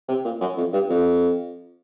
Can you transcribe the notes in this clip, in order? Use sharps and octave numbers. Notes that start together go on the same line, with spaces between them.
C3
A#2
F#2
F2
G2
F2